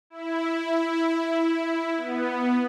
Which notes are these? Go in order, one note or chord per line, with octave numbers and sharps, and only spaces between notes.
E4
B3